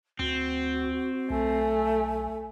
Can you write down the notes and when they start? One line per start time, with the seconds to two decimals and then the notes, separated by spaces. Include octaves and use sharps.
0.19 D2 C4 F#4
1.30 B1 A3 G#5